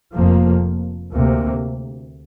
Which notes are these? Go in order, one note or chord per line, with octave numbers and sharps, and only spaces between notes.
F1 F2 F3 A#3
D2 C3 A#3